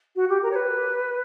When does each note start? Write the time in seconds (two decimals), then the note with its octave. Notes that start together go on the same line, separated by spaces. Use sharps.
0.15 F#4
0.29 G4
0.43 A#4
0.51 C#5
0.55 B4